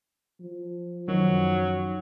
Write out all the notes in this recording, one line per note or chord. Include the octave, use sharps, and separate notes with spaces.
F3
F#2 D#3 F#3